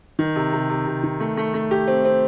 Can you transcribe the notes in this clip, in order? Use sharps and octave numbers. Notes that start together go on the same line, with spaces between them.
D#3
C3
C3
C3
C3
D#3
A3
A3
A3
G4
C4
C4